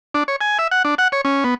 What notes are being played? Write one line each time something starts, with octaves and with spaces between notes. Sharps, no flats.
D4
C#5
G#5
E5
F#5
D4
F#5
C#5
C#4
B3